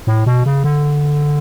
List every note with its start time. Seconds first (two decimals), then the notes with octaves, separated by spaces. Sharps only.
0.07 A2
0.26 B2
0.46 C#3
0.64 D3